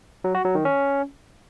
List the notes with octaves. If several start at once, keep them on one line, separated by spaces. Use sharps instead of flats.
F#3
F#4
F#3
D#3
C#4